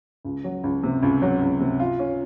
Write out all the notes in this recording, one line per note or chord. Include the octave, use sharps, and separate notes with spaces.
C#2
F#3
C#2
C3
C#2
F#3
C#2
C3
F4
C#4